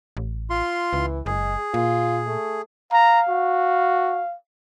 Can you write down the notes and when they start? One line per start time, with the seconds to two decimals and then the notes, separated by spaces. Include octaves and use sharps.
0.17 A1
0.50 F4 C6
0.93 C#2 E3
1.26 F#1 G#3 G#4
1.74 A#2 F4
2.27 A3
2.92 F5 A#5
3.29 F#4